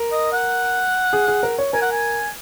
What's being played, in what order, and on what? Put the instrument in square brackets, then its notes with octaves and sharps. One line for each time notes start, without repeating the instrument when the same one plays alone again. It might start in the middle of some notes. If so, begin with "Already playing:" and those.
Already playing: [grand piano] A#4
[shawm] D#5
F#5
[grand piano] G#4
G#4
A#4
C#5
[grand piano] A#4 [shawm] G#5
[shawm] F#5
G#5